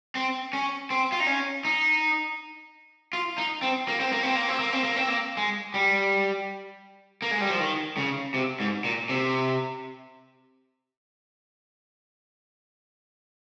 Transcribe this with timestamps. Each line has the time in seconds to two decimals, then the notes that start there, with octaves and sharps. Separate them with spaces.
0.15 C4
0.53 C#4
0.90 C4
1.12 F4
1.20 D#4
1.27 C#4
1.65 D#4
3.13 F4
3.38 D#4
3.62 C4
3.88 A#3
4.00 C4
4.12 A#3
4.23 C4
4.35 A#3
4.48 C4
4.60 A#3
4.73 C4
4.84 A#3
4.97 C4
5.08 A#3
5.37 G#3
5.74 G3
7.22 A#3
7.31 G#3
7.41 G3
7.50 F3
7.60 D#3
7.97 C#3
8.34 C3
8.60 G#2
8.84 A#2
9.09 C3